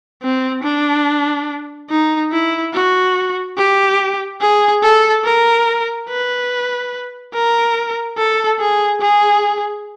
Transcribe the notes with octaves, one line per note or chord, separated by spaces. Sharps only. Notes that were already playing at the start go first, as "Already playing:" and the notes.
C4
D4
D#4
E4
F#4
G4
G#4
A4
A#4
B4
A#4
A4
G#4
G#4